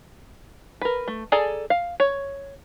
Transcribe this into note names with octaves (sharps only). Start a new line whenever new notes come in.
A#4 B4
A3
G#4 A4 D5 G#5 A#5
F5
C#5